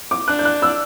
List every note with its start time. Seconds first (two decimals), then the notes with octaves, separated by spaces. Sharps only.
0.11 D6
0.28 D4 F#6
0.39 G6
0.45 F#6
0.62 E6